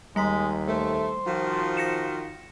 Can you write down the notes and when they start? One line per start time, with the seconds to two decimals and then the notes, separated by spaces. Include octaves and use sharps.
0.16 D#2 G3 G#3 A#5 B6
0.68 A3 C5
1.26 D#3 F3 F4 F#4
1.77 A#6 C#7 E7